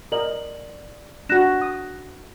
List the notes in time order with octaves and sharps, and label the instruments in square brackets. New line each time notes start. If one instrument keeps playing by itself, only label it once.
[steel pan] A#4 D#5 [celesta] D5 F#7
[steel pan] D4 F#4 [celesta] F#6 A#6 E7
[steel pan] D#6